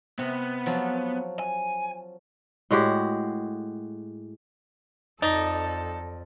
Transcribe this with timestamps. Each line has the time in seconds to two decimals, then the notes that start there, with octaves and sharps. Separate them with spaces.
0.19 C3 B3
0.66 F3 F#3
1.39 G#5
2.71 A2 G#3 F#4 G4
5.22 F2 D#4 A4 D5 D#5